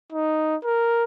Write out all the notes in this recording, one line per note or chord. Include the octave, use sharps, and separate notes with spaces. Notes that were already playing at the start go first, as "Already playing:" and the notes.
D#4
A#4